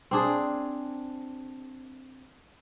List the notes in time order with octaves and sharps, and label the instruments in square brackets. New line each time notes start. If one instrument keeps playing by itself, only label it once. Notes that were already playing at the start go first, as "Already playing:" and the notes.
[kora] C4 D4 G#4